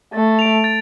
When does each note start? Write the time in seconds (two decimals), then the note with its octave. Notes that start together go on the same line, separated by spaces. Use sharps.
0.13 A3 A6
0.39 D7 F7
0.64 A6